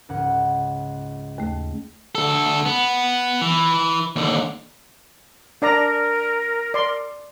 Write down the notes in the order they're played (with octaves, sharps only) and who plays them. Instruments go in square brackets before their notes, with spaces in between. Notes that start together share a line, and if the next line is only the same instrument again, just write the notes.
[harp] C#2 G#2 F#5
[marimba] D#2 A3
[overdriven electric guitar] D2 A4
B3
E3
D#2 D3
[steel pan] D4 D5 A#5 [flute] A#4
[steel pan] D5 C6